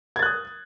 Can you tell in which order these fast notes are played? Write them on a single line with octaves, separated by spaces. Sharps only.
G#6 A6 F#6 D#6